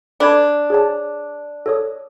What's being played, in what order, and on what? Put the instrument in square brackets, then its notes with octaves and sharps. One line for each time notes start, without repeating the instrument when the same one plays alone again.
[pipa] D4 [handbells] A4 B5 G#6
[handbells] G#4 C#5 A5
A4 C#5 D#6